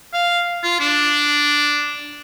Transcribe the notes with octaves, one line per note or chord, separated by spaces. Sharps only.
F5
F4
D4